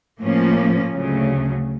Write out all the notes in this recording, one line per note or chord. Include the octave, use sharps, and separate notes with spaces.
A2 F3 A#3 C#4
D2 C#3 F#3 A3